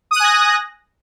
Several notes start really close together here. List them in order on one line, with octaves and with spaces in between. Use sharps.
D#6 F#6 G#5 A#6